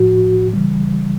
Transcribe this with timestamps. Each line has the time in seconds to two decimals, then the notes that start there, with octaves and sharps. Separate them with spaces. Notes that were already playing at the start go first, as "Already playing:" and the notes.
Already playing: A2 F3 F#4
0.54 C#3 E3 G3